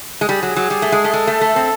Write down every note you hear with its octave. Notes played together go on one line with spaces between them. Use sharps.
G#3
G3 G#4
F#3
F#3
G3
A3
G#3
A3
G#3 A4
A3
A3
C4